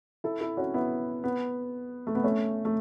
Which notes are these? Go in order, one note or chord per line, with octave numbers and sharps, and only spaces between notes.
E4 A4
E4 A4
C#4 F#4
B3 E4
B3
A3
B3
A3 C#4
A3